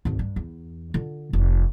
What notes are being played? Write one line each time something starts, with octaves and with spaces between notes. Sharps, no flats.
G#1 D2
G2
E2
D3 F4
F1